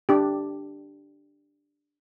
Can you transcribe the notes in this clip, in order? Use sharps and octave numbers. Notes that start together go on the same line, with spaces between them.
D4 G4